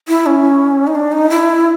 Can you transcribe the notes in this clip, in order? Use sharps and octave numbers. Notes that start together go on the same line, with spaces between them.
E4
C#4
D#4
D4
D#4
E4